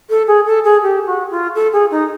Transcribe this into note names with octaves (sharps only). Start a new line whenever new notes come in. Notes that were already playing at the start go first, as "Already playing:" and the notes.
A4
G#4
A4
G#4
G4
F#4
F4
A4
G#4
D#4